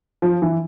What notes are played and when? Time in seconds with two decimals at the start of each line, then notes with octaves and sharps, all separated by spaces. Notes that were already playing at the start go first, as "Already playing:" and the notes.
0.22 F3
0.42 E3